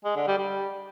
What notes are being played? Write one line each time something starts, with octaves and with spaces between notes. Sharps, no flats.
G#3
D3
G3
G3